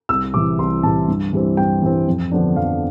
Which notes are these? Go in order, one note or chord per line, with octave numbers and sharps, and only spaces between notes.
C2 E6
C3 E3 D6
C2 C6
C3 E3 A5
G2
E3 G3 C4
G2 G5
E3 G3 C4
F2
D3 F3 B3 D4
F2 F5